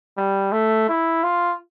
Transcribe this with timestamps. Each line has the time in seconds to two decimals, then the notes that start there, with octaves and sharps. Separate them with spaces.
0.17 G3
0.52 A3
0.89 E4
1.23 F4